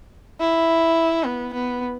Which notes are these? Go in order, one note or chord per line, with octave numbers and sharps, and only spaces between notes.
E4
B3
B3